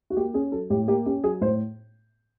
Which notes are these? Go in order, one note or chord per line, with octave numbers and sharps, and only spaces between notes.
F#4
A#3 G4
C#4 G#4
F#3 A4
A2 G4
A#3 G4
C#4 G4
F#3 G#4
A2 C5